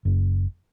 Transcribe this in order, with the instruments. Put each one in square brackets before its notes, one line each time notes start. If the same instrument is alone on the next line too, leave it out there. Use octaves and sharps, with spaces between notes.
[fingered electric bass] F#1